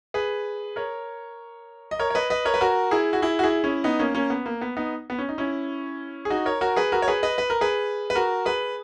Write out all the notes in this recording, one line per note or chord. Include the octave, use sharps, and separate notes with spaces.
G#4 B4
A#4 C#5
D#5
A#4 C#5
C#5
B4 D#5
B4 D#5
A#4 C#5
B4
F#4 A#4
E4 G#4
F#4
E4 G#4
F#4
E4 G#4
C#4 E4
B3 D#4
A#3 C#4
A#3 C#4
B3
A#3
B3
B3 D#4
B3
C#4
D#4
C#4 E4
G#4
D#4 F#4
A#4 C#5
F#4 A#4
G#4 B4
F#4 A#4
C#5
G#4 B4
B4 D#5
B4
A#4
G#4 B4
B4
F#4 A#4
G#4 B4